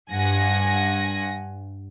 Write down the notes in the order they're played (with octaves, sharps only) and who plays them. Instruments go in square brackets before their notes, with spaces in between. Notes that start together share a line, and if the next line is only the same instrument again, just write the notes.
[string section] G2 F#5 G#5 A#6